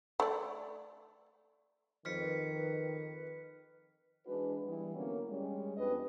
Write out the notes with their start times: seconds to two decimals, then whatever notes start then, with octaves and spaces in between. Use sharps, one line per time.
0.20 A3 D5
2.05 F2 D#3 B4 F6 B6 C#7
4.26 E3 G#3 D4 F#4 B4
4.65 E3 G3 B3
4.95 D3 F#3 A#3 B3 C#4
5.28 G3 G#3 C#4
5.77 F2 B3 D4 G4 B4 D#5